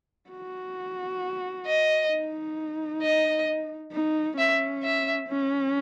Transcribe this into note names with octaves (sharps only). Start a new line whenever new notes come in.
F#4
D#5
D#4
D#5
D#4
C#4 E5
E5
C#4